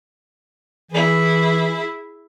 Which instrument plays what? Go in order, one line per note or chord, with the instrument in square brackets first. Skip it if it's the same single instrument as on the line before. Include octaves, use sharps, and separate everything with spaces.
[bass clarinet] E3 [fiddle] E4 G#4